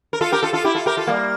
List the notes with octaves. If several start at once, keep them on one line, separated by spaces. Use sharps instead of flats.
A#4
F4 A4
G4 A#4
F4 A4
F4 A4
E4 G4
F4 A4
G4 A#4
F4 A4
G3 A#3